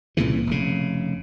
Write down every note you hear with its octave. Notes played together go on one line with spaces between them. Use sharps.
C2 A#2 C#3 E3
F1 C#3